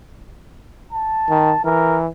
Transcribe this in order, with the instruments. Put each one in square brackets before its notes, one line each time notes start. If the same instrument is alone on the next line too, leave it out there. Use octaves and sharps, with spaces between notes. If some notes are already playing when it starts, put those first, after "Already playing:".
[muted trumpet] A5
[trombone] D#3
[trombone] E3 [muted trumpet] A#4